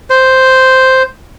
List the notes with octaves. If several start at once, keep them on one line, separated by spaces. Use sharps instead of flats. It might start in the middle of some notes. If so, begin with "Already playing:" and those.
C5